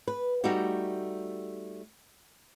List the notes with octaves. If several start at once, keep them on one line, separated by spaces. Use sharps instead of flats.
B4
G3 A3 D#4 F#4 G4